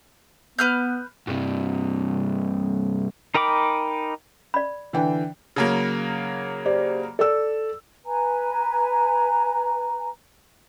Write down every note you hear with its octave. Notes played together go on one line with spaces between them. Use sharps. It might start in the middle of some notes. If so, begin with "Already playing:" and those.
B3 B4 F6 G6
G2 C3
D#4 A#4 G5 B5 D6
D5 B5
D3 E3 G5
C#3 F#3 A#3
G4 C5 D5
A4 D5 E6
B4 G#5 A#5